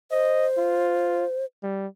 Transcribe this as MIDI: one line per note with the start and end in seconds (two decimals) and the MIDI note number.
0.11 1.45 72
0.11 0.47 75
0.58 1.25 65
1.63 1.87 55